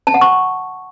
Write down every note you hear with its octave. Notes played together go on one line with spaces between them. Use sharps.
A5
F#5
C#6